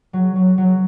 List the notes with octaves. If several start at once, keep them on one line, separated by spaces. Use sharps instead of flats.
F#3
F#3
F#3